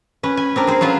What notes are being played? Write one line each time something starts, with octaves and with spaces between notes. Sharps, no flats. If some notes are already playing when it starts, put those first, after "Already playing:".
C#4 B4
G#5
C4 D4 A#4
G#4 C5
F#3 C#4 F4 B4 F5